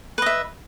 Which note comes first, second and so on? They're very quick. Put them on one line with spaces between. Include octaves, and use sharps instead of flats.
B4 D#5 E5